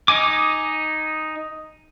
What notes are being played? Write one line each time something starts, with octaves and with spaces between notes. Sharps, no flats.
D#4 D#5 G#5 D6